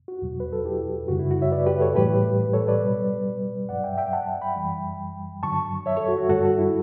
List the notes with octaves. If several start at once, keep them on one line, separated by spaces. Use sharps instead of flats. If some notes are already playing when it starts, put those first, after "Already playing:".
F#4
E2 B2 F#3
B4
A4
E4 G4
F#2 C#3 G3 F#4
E4
F#4
C#5 E5
B4 D5
G4 B4
A4 C#5
A2 E3 G3 G4 B4
A4 C#5
B4 D5
B2 G3
G2 F#3 D5 F#5
E5 G5
E5 G5
F#5 A5
G5 B5
F#2 E3 G3
G2 D3 F#3 A5 C#6
C#5 E5
A4 C#5
F#4
F#4
G2 D3 G3 F#4 A4
F#4
E4